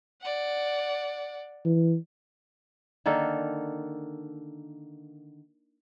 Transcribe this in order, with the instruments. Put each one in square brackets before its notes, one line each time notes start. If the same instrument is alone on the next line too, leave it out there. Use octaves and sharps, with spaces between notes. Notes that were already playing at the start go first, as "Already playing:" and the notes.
[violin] D5 F#5
[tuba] E3
[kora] D3 D#3 A#3 A4